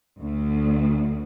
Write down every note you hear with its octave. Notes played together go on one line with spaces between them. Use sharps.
D2